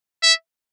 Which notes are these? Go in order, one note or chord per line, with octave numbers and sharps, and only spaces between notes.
E5